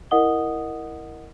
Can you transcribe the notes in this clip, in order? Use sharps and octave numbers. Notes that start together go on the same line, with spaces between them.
E4 A#4 D#5 F#5 D#6 G7